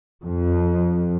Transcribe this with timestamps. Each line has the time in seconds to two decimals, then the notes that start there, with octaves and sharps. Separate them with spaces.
0.24 F2